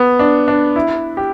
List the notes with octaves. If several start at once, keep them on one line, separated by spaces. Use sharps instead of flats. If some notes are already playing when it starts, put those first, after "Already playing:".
Already playing: B3
D4
D4
E4
G4